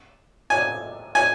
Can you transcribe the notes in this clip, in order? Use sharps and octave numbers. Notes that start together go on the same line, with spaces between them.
G#5
G#5